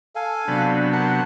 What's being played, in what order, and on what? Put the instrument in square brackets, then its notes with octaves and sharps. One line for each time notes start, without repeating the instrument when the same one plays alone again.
[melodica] A4 F5 G#5
[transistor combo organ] C3 F#3 B3 [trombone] D4
[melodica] A#4 F#5 A5